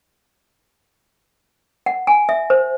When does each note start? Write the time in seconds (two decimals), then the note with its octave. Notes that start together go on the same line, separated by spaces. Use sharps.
1.86 F#5
2.07 G#5
2.29 E5
2.50 C5